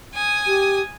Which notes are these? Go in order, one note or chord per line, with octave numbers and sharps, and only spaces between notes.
G#5 D#6
G4